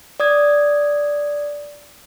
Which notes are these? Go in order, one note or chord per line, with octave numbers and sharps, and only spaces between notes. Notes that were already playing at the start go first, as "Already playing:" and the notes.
D5 D#6 G#6